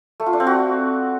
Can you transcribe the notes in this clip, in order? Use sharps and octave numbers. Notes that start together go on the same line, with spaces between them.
A3
F4
D4
C4
F#4